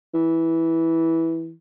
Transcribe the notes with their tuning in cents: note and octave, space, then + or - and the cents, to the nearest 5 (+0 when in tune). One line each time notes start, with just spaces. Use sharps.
E3 -10